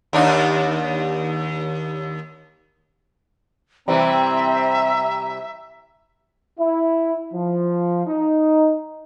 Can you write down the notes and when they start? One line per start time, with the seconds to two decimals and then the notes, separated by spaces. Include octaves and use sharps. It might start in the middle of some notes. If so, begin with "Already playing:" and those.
0.13 D#2 D4 D#4
3.88 C3 E3 G3 C4 E5 A#5
6.58 E4
7.33 F3
8.07 D#4